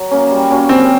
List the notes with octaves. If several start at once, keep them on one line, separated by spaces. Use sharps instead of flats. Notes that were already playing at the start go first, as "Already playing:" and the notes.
Already playing: F#3
A#3 C#4
G3
A#3 C#4 F#4
G3 C4